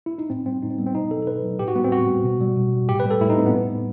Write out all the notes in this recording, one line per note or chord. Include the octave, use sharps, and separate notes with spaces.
E4
D#4
A2 C4
G3 C4
A2 D#4
C4
G3 B3
C4
B2 D#4
F#3 A4
A4
B2 B4
F#3
A2 G4
F#4
G3 B3
C4
A2 F#4
G3
B2
G3
B2
G3
A2 G4
B4
G3 A4
A2 E4
D#4
G3 C4
B3
A2
G3